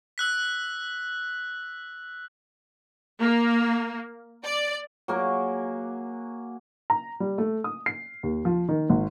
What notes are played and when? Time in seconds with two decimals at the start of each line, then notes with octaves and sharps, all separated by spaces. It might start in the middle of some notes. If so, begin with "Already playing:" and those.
0.18 E6 F#6 B6
3.21 A#3
4.45 D5
5.08 F#3 A#3 G#4 D6
6.90 A#5
7.20 G3
7.38 A3
7.64 D#6
7.86 C7
8.23 D#2
8.45 F3
8.69 D#3
8.90 G#1